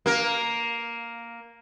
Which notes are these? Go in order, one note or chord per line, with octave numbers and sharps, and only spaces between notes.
A#3 A#4